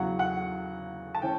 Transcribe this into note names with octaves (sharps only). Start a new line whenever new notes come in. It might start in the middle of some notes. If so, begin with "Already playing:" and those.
Already playing: E2 C#3 F#3 F#5
F#5
A5
E3 C#4 G5